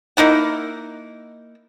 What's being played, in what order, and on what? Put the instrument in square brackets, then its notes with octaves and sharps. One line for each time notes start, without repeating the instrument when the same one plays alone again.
[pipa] A#3 D#4 E4 F#5